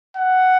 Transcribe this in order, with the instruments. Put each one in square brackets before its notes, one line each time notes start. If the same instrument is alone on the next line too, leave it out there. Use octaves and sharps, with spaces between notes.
[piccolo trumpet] F#5